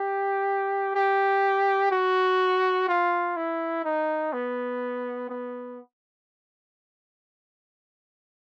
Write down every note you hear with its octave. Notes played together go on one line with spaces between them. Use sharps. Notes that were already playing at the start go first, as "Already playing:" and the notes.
Already playing: G4
G4
F#4
F4
E4
D#4
B3
B3